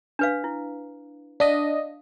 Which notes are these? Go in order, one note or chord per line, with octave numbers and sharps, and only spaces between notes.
D4 B4 F5
E4
D4 D#5 F5